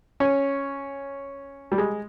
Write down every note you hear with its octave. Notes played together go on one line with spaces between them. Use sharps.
C#4
G3
G#3